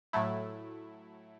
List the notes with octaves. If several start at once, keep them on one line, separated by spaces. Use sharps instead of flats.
A2 F#3 A3 E4